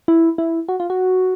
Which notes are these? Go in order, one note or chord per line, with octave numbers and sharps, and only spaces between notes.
E4
E4
F#4
F4
F#4